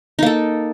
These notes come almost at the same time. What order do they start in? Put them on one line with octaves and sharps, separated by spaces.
D#4 A#3 A4